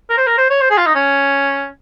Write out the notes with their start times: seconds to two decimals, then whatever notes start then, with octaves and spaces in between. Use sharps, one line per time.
0.10 A#4
0.18 C5
0.27 A#4
0.38 C5
0.50 C#5
0.61 C5
0.70 G#4
0.78 F4
0.87 D#4
0.95 C#4